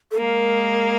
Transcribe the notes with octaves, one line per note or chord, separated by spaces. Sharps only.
A4
G#3 A#3 A#4